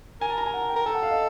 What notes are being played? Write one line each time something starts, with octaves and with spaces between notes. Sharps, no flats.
A#4 G#5
A5
A#5
G#5
F#5
G5
A#4
A4 G5
F#5
F5
D#5